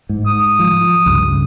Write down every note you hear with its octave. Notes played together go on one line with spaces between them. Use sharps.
G#2
D#6
F3
C#2 G2